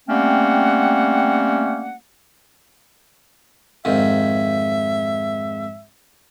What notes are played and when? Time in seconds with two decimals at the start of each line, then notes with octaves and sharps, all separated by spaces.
0.08 G3 A3 A#3 C4 C#4 F#5
3.85 F2 G#2 D#3 E5